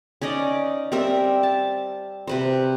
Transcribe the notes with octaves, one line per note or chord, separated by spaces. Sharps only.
C#4 D#4 D5 D#5
G3 C4 A#4 E5
A5
C3 B4 C5